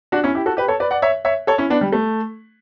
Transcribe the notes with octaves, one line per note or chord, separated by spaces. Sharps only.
D4 F#4
C#4 E4
E4 G4
F#4 A4
G4 B4
A4 C#5
B4 D5
D5 F#5
C#5 E5
C#5 E5
A4 C#5
C#4 E4
B3 D4
G3
A3